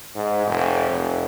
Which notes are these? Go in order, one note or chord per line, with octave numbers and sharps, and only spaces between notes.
G#2
F1
F1